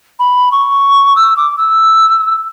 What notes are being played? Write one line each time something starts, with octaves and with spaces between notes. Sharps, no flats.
B5
C#6
E6
D6
E6